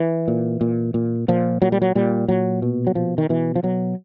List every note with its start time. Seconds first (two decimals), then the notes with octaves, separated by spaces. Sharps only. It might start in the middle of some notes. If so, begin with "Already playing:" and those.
Already playing: E3
0.28 A#2
0.61 A#2
0.94 A#2
1.28 A#2 F3
1.62 A#2 F#3
1.72 G3
1.82 F#3
1.95 A#2 G3
2.28 A#2 F#3
2.62 B2
2.87 F#3
2.95 B2 F3
3.18 D#3
3.29 B2 E3
3.56 F3
3.63 B2 F#3